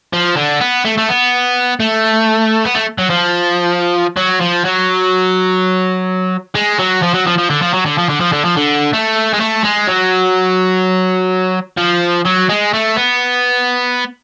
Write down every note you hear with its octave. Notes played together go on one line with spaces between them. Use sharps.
F3
D3
B3
A3
A3
B3
A3
B3
A3
F#3
F3
F#3
F3
F#3
G#3
F#3
F3
F#3
F3
F3
D3
F3
F#3
D3
F3
D3
F3
D3
F3
D3
A3
G#3
A3
G#3
F#3
F3
F#3
G#3
A3
B3